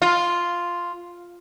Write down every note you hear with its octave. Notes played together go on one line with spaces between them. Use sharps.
F4